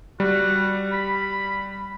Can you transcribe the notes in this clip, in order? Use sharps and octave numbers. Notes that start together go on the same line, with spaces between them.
G3 F#4
B5